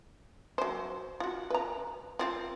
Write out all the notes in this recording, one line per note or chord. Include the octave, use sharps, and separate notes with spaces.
F#3 C5
F4 F#4
B4 A#5
C4 F4 F5